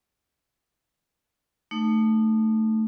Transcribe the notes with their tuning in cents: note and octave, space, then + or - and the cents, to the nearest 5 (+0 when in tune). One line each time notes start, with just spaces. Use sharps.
A3 +0 D#4 -25